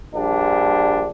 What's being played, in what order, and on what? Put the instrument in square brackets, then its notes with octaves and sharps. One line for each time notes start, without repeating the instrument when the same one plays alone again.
[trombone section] A#1 G3 D4